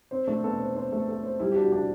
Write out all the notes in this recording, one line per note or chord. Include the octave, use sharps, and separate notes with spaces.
C4 C5
A3 D4
C4
B3 A4
C5
D4 C5
A3
A4
C5
G3 E4
G4
D4 F#4
D4 G4